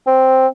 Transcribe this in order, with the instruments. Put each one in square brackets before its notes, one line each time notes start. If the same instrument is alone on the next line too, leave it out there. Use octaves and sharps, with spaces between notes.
[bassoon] C4